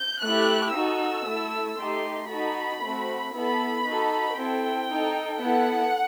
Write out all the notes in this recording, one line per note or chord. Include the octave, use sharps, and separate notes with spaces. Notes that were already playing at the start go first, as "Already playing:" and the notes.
Already playing: G6
A3 E4 G4 F#6
D#4 F#4 A4 E6
A3 E4 A4
A3 D#4 G4 C6
D#4 F#4 A4 B5
A3 C4 F#4
B3 E4 A4 B5
D#4 F#4 A4
C4 E4 A4 G5
D#4 A4
B3 E4 A4 F#5